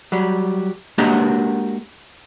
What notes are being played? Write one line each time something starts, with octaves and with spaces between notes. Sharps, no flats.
F#3 G3
G#3 A#3 D4 F#4 G4 A#4